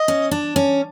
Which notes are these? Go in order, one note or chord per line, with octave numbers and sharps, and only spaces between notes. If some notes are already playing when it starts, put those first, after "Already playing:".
Already playing: D#5
C#4
D4
C#4